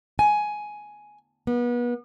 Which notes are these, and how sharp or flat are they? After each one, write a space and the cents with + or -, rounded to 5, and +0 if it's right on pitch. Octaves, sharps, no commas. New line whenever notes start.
G#5 +10
B3 -35